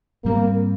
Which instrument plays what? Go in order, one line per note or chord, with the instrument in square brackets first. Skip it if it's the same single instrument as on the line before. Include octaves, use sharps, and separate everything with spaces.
[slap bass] G#2 G3 C4 [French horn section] A#3